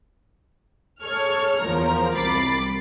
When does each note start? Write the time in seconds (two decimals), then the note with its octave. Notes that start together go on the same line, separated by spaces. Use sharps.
1.03 G#4 A4 C#5 C#6 F6
1.60 E2 F3 A#4 A#5
2.15 C2 B5 D6 A6 C7